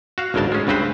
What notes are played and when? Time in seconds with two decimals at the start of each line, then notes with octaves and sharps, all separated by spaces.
0.18 F#4 F5
0.34 G#1 D2 B2 F#3 A#4 A5
0.52 G#3 C#4
0.67 D2 G2 C#3 C4 B4 C5